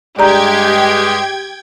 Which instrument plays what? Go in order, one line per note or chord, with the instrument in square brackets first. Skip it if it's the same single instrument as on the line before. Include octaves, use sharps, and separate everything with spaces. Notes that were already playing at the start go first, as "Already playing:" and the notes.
[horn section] G2 G#3 [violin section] G4 [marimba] D5 A#5 G6 [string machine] G5 G#6